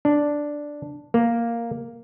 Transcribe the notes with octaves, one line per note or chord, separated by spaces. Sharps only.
D4
A#3